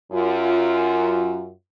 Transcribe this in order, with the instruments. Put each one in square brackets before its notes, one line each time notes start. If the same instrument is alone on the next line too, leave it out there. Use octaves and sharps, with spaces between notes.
[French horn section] F#2 F4